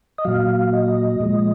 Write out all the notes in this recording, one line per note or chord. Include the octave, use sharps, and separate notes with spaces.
D#5
A#2 F#3 F5
D#5
A#2 F3 G#3